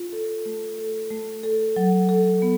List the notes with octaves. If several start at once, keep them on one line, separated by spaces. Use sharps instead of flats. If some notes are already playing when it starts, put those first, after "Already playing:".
Already playing: F4
A4
A3
A4
A3
A4
F#3
A4
B3